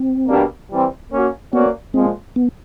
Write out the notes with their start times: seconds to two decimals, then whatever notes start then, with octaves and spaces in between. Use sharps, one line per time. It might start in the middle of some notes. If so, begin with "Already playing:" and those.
Already playing: C4
0.27 B2 G3 A#3 D4 G4
0.70 E3 G3 C4
1.11 A#3 C#4 F#4
1.52 A#3 B3 C#4 F#4 B4 D5
1.94 A#2 F3 G#3 C4
2.36 B3